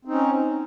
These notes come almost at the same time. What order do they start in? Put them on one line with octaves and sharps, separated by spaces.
C4 D#4 C#4